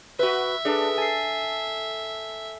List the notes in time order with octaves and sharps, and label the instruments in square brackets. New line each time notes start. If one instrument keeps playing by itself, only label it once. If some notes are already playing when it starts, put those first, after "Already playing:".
[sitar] F#4 B4 [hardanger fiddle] E5
[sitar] D4 [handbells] G#4 A4 B4
[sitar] A4 [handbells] G#5 C7